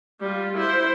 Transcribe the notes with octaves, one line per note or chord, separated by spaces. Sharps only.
G3 F4
E4 C5